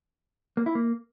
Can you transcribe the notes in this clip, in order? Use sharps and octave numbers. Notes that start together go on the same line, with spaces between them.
A#3
E4
A#3